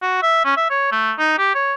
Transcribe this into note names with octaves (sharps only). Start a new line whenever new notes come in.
F#4
E5
C#4
E5
C#5
A3
D#4
G4
C#5